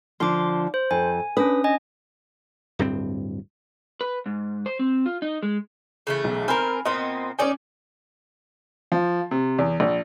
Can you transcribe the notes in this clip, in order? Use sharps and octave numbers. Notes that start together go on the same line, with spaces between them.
D3 F3 C6 D6
C5
F2 G#5
C#4 D4 B4 D#6
D#5 G#5
D1 G2 C4
B4
G#2
C5
C4
F4
D#4
G#3
C#3 E3 A3
B1
C4 A#4 G#5 B5 F6
A#2 B3 C4 D#5 C6
C#4 D#4 C#5 D5 G#5
F3
C3
E2
A#1